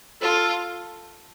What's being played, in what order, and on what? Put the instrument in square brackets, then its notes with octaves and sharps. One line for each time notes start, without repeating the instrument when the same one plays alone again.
[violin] F4 [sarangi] A4